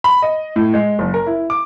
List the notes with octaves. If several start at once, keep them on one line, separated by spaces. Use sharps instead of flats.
B5
D#5
A2
G#3
F#1
A#4
E4
D6